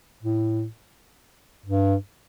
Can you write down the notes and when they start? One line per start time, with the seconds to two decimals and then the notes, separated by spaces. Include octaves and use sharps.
0.23 A2
1.66 G2